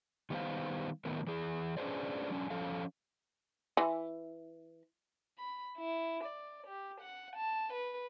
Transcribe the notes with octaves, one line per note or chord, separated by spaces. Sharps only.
D#3 G3 B3 G4 C5 F5
A2 D#3 B3 A#4
E3 G#4
C#4 D4 G#4 B4 C5 D5
F#3 C#4 D4
F3 C#4 A4 F5
E3
B5
E4
D5
G4
F#5
A5
B4